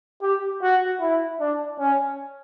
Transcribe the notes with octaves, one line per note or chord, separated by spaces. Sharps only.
G4
F#4
E4
D4
C#4